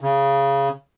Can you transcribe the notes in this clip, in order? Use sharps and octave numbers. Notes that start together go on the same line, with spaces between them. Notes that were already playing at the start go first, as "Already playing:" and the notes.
C#3